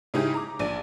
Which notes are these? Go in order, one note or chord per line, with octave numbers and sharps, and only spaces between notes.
C#3 G#3 D#4 E4 G4 G#4
A#5 D6
A#1 D5 D#7